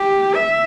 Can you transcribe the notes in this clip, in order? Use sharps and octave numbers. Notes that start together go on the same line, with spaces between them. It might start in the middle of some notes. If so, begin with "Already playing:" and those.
Already playing: G4
E5